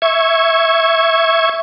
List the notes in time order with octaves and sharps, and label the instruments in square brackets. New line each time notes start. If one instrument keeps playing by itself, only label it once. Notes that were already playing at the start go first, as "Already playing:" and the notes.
[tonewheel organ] E5 C#6 G#6